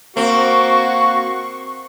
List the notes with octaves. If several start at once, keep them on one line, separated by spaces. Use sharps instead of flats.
A#3 C4 F#4 C#6